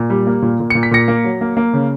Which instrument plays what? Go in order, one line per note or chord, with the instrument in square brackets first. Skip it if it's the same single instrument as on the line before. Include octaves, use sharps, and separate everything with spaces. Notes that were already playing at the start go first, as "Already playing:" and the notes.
Already playing: [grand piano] A#2
G3
A#3
A#2
A#2
A#2 C#7
B6
A#2 A#6 C#7
A#3
F#3
A#3
A#3
C#3